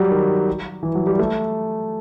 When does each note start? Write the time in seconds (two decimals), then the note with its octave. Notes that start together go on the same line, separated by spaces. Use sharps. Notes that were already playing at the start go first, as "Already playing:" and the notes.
Already playing: F#3 G3
0.11 D#3
0.83 E3
0.95 F#3
1.07 G3
1.19 A3